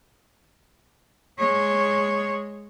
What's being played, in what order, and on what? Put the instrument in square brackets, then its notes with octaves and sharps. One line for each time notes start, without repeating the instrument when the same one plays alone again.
[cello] G#3 C#5